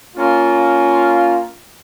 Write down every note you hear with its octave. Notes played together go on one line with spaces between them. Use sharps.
A#3 C#4 F4